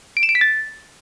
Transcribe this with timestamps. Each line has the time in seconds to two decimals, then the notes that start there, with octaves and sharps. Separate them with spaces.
0.17 D7
0.23 E7
0.29 D7
0.35 B6
0.41 A6